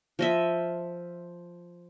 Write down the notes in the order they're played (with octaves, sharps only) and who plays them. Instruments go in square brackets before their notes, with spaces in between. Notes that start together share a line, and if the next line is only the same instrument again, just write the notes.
[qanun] F3 D#5 E5